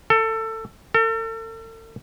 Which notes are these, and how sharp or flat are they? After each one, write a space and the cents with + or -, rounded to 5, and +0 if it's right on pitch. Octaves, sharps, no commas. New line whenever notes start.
A4 +20
A4 +40